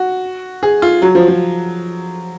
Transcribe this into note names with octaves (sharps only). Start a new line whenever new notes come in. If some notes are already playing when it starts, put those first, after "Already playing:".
Already playing: F#4
G#4
F4
F#3
F3
F3